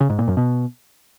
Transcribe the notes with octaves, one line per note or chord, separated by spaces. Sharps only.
C#3
G#2
A#2
F#2
B2